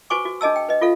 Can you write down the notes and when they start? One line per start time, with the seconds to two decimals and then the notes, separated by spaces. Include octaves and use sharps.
0.10 F#4 B4 C5 G#5 C#6 D6
0.25 F#4
0.41 D4 G#4 D#5 A5 E6
0.56 G5
0.69 B4 D#5
0.81 F4 A4 F5